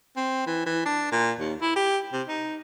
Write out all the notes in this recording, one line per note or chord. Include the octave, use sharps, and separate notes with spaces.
C4
E3
E3
D4
A#2
D#2
E4
G4
C3
D#4